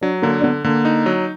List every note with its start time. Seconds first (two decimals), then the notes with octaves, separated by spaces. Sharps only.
0.01 F#3 D4
0.22 D3 A#3
0.40 D4
0.43 D3 B3
0.64 D3 A#3
0.85 D#4
1.06 F#3